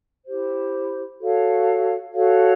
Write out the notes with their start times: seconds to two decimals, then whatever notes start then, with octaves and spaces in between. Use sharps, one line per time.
0.26 E4 G4 C5
1.20 F#4 A4 C#5 F5
2.13 F#4 A4 C#5 F5